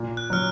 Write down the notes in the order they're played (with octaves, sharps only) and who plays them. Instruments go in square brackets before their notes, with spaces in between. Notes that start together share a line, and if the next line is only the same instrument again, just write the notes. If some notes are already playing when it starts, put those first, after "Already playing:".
Already playing: [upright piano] A#2
[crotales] F#6
[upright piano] F#3 [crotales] F6